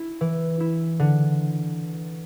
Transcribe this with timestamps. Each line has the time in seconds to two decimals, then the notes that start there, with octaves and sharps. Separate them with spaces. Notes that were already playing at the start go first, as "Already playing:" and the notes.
Already playing: E4
0.21 E3
0.60 E4
0.99 D3